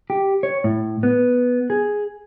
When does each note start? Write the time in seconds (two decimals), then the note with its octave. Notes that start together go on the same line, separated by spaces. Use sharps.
0.10 G4
0.43 C#5
0.64 A2
1.03 B3
1.70 G#4